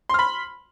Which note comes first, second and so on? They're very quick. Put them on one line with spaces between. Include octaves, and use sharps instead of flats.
C6 F6 B5